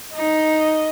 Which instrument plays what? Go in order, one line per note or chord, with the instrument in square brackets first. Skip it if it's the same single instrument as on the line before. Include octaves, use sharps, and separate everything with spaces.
[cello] D#4 [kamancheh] D#5